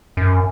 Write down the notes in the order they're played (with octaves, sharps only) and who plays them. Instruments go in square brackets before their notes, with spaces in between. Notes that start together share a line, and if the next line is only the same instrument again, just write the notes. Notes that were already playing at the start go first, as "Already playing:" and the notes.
[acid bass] F#2